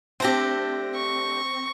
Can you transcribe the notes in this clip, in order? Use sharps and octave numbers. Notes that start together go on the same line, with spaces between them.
A3 C4 D4 G4 A#6
C#6